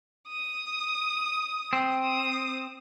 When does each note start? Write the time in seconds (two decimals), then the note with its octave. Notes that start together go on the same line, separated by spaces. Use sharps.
0.28 D#6
1.73 C4
2.03 D#6